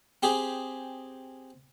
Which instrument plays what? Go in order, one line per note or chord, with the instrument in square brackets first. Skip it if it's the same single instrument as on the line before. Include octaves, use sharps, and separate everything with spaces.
[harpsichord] C4 G4 G#4